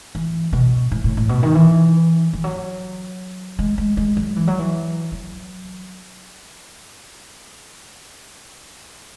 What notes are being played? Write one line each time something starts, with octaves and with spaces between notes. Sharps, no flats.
E3
B2
A2
A2
A2
B2
D#3
E3
E3
F#3
G#3
G#3
G#3
F#3
E3
F#3
E3
F#3